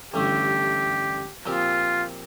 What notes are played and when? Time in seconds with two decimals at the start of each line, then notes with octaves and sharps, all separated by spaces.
0.14 A1 G2 D3 A3 G4
1.46 A#2 F3 C4 F4 G4